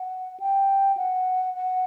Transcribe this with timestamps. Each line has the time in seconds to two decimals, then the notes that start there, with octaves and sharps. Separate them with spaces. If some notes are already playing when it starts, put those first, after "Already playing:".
Already playing: F#5
0.40 G5
0.97 F#5
1.56 F#5